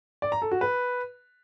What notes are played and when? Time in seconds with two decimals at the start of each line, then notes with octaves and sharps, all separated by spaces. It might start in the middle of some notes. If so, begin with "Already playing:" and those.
0.22 D5
0.32 A#5
0.42 A4
0.51 F#4
0.61 B4